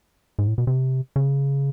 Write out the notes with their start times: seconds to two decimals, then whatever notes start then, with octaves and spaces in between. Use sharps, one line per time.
0.39 G#2
0.47 A2
0.58 B2
0.67 C3
1.16 C#3